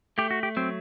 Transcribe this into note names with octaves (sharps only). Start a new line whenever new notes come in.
A3 G4
F#4
G4
F#3 C4